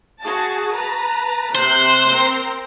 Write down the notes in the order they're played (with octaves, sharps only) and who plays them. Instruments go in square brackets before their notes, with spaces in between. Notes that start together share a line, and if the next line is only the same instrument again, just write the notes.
[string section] F#4 G#4 A5
B4 A5 A#5
[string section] C3 F#6 G6 [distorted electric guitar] C5
[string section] C4 A#4